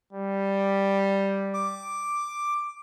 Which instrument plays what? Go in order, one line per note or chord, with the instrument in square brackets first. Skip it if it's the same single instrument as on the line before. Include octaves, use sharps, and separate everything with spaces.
[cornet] G3
[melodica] D6